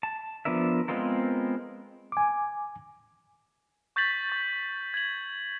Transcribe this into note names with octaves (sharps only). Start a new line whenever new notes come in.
A5
F3 B3 D4 A#4 E5
G#3 B3 C4 F4 A#4
G#5 D6
C#6 G6 A6 B6 F#7
C#6 A6
G#6 F#7